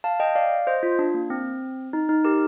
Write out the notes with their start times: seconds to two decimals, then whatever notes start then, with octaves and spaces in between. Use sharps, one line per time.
0.04 F5 A5
0.20 D#5 G5
0.35 D5 F5
0.67 C5 D#5
0.83 F4
0.99 D4
1.14 A#3
1.30 C4
1.93 D#4
2.09 D#4
2.25 G4 A#4